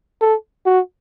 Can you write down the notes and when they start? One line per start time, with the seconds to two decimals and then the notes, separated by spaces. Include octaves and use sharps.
0.21 A4
0.66 F#4